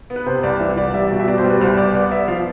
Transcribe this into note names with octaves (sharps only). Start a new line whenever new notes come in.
B3
B4
C3 C5
C2 D5
E3 E5
E3 D5
G3 E5
B2
E5
B2 D5
C5
G3
B4
C2 C5
C2 D5
B3 D5
B3 E5
F3 F5